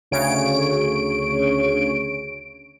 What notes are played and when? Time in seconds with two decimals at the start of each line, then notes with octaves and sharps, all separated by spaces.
0.11 D2 C#3 C#5 D7